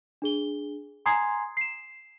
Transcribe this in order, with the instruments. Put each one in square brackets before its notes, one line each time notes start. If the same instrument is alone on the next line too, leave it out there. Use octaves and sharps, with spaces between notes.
[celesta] D4 G#4 G7
G#5 A#5 C6 D#6 G#6 C7
C7 E7